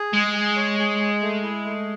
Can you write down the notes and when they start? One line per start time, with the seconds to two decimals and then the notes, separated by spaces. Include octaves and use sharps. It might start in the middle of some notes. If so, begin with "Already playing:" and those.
Already playing: G#4
0.13 G#3 G#5
0.35 G#4
0.56 C#5
0.79 G#4
1.00 G#4
1.21 A3
1.43 E4
1.65 A3